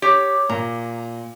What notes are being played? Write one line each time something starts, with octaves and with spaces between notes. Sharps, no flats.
G4 C#5
A#2 A#5